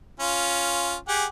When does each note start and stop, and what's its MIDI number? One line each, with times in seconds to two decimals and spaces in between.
0.20 0.95 61
0.20 0.95 65
1.08 1.25 67
1.08 1.25 68
1.08 1.25 78